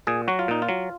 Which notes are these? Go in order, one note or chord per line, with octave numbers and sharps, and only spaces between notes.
A#2 G#4
F#3 F#4
F4
A#2 D#4
F4
F#3